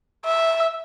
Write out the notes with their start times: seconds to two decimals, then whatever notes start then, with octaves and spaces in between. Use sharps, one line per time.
0.25 E5